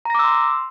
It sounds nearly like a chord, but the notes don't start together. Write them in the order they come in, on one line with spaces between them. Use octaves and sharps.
A#5 A#6 D6 E6 C6